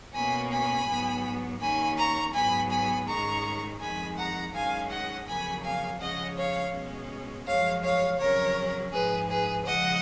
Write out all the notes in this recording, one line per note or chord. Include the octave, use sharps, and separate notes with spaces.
B2 A#3 C#4 G#5 B5
G#5 B5
G#2 F#3 B3
D#2 D#3 A#3 C#4 G#5 B5
A#5 C#6
G#2 F#3 B3 G#5 B5
G#5 B5
G#2 D#3 G#3 C#4 A#5 C#6
F2 D#3 G#3 G#5 B5
F#5 A#5
F#2 D#3 G#3 C#4 F5 G#5
D#5 F#5
F2 C#3 F#3 A#3 G#5 B5
F5 G#5
C#3 F3 G#3 C#4 D#5 F#5
C#5 F5
B2 G#3 C#4
F#2 F3 G#3 C#5 F5
C#5 F5
F2 C#3 F#3 C#4 A#4 C#5
G#2 F3 G#3 G#4 B4
G#4 B4
C#3 F3 G#3 D#5 F#5